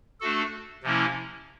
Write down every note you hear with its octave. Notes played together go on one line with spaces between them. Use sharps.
A3 D4 F#4 A4
C3 F3 A#3 C#4 E4